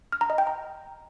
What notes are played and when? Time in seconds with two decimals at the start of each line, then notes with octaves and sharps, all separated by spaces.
0.12 F6
0.21 A#5
0.30 D#5
0.38 G5
0.47 A#5